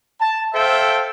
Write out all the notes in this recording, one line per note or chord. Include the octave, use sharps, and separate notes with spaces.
A5
A4 C5 E5 F5 G5